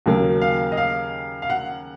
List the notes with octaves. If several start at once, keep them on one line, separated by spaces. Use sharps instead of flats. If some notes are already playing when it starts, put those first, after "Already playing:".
D#2 C#3 F#3 A#3
F5
D#5
F5
F5
F#5